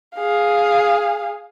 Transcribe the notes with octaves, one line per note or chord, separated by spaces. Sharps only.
G#4 F5